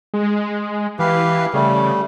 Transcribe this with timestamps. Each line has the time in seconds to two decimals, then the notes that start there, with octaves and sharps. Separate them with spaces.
0.14 G#3
0.99 E3 G4 B4 F5
1.54 C#3 G3 A3